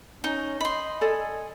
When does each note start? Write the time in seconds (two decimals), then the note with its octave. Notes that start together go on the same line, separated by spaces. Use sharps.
0.24 C#4 D#4
0.61 D#5 B5 C6
1.01 A4 D5 D#5 G#5